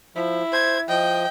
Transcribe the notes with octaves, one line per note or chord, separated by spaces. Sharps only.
F3 E4
C5 G#6
F3 D#5 G5